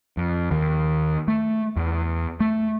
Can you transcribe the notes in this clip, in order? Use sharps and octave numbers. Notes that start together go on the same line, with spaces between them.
F2
D#2
A3
E2
A3